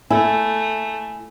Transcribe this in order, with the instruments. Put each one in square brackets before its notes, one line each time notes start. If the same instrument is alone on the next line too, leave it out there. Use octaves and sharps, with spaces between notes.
[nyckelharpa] A3 [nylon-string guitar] E4 [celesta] G#5